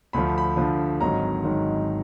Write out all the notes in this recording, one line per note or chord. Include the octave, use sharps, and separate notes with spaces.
D2 D3 F3 B5
B5
D2 D3 F3
G#1 G#2 D#3 F#3 A#5
G#1 G#2 D#3 F#3